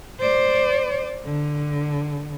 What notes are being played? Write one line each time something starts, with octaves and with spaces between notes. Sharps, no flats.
C5 D5
D3